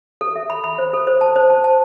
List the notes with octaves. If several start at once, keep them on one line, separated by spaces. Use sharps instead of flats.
A4
E5
B5
B5
C5
A4
C5
A5
C5
A5
A5